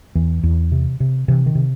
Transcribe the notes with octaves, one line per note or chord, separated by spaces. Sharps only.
E2 E3
E2
C3
C3
C3 E3
D#3
C3